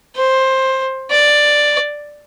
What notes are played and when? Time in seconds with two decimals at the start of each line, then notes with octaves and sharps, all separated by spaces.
0.16 C5
1.11 D5